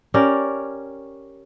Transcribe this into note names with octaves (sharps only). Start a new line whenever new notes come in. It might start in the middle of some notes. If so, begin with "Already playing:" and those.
C#4 G4 A#4 D5